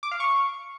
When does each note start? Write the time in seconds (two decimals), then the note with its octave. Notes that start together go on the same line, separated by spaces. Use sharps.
0.03 D6
0.11 F5
0.20 C#6